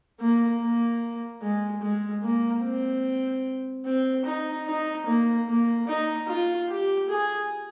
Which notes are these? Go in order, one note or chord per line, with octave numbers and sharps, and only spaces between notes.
A#3
A#3
G#3
G#3
A#3
C4
C4
D#4
D#4
A#3
A#3
D#4
F4
G4
G#4